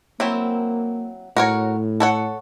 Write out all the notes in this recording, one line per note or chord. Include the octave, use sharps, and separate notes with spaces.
F#3 A#3 C4 E4
A2 F#4 A#4 C#5
A4 C#5 F#5